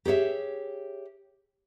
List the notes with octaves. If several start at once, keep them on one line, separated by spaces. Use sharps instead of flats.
G4 G#4 C#5 E5